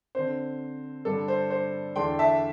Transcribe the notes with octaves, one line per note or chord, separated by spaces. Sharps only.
D3 C4 C5
G2 D3 G3 D4 A4
C5
C5
E2 D3 A3 D4 G5 C6
E5 A5